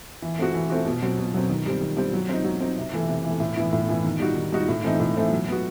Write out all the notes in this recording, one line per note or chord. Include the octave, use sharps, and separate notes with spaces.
E3
A3 C4 F#4
E3
A3 C4 F#4
B2
F#3 C4
B2
F#3 C4
D#3
G3 C4
D#3
G3 C4
F#3
C4 D#4
F#3
C4 D#4
C3
E3 A3
C3
E3 A3
A2
E3 B3 E4
A2
E3 B3 E4
D#3
G3 D#4 F#4
D#3
G3 D#4 F#4
A2
E3 A3 C4 D#4
A2
E3 A3 C4 D#4
F#3
B3 F#4